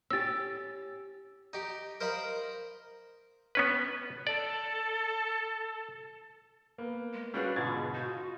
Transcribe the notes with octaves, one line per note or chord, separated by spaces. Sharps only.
C#4 G4 E6 A6
D#4 G4
A#4 C5 D#5 F5 A#5 B5
B3 C#4 B4
A4 D5
A#3 B3
G#3
G3 C#4 D4 F4 F#4 G#4 B4 F#5
G#2 B2 D3 F4 C#6 G#6 A6
D#4 F#4